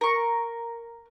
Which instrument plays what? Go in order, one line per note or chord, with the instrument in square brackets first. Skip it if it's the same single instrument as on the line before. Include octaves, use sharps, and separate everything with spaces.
[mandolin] A#4 C#6